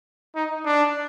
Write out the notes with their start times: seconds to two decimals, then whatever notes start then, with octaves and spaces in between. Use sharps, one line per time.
0.36 D#4
0.65 D4